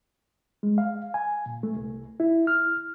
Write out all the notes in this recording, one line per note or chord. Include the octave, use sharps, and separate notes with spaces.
G#3
F5
G#5
A#2
A3
C2
E4
F6